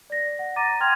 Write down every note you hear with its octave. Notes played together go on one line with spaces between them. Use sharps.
D5 A#6
F#5
F#5 A#5 D6 A6 A#6 D#7
G5 C6 F6 G#6 F7